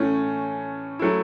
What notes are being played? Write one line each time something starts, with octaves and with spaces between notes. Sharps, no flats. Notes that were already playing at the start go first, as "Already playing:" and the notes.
Already playing: A2 E3 A3 C#4
F#3 A3 E4